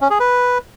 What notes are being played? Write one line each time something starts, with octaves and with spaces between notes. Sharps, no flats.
C#4
G#4
B4